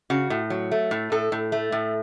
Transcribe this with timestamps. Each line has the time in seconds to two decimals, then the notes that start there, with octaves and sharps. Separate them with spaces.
0.10 C#3 F#4
0.30 A2
0.50 F#3
0.71 A3
0.91 A2
1.12 A2 A4
1.32 A2
1.52 A3
1.72 A2